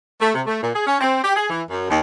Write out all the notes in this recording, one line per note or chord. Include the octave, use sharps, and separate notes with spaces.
A3
C3
A3
A#2
G#4
C#4
C4
G4
G#4
E3
F#2
D#2